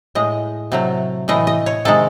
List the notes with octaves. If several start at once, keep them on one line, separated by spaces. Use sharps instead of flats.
A2 G#3 D#5
C3 F#3 A3
A2 E3 A3 D#5
D#5
C#5
C3 D#3 G#3 A4